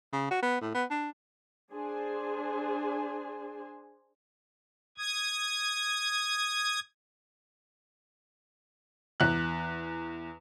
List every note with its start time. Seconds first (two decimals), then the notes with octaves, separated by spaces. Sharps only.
0.12 C#3
0.31 F#4
0.43 B3
0.61 A2
0.75 B3
0.90 D4
1.73 D4 G#4 C5 G#5
4.98 D#6 G#6
9.20 E2 F#6